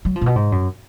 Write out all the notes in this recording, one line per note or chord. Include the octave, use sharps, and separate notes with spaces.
F#3
F3
A#2
B2
G#2
F#2